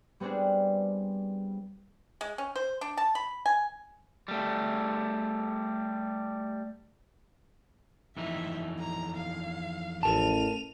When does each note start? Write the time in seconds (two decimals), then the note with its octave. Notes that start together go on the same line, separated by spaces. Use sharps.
0.20 G3 B3 C4 D4 G#4
2.21 G#3
2.38 C#4
2.56 C5
2.81 D4
2.97 A5
3.15 B5
3.46 G#5
4.28 G3 A3
8.16 F2 E3 D#4 E5
8.80 A#5
9.16 F5
10.03 A1 A#4 A5 D#7 F7